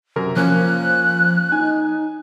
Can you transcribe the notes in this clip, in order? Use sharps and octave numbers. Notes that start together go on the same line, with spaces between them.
F#2 C3 A#4
F3 A#3 C#4 F#6
D#4 G#5